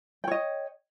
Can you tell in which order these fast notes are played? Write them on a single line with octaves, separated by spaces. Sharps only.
G5 C#5 D#5